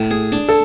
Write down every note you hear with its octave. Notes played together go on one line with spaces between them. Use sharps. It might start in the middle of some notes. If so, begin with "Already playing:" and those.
Already playing: A2
G#4
D4
A4